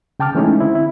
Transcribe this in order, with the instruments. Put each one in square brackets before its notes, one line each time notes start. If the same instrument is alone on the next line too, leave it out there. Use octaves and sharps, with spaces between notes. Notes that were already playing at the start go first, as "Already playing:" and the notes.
[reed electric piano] C#3 G5 A5 D6 F6
E3 G#3 A3 C#4 D#4 E4
D3 C4 E4
E4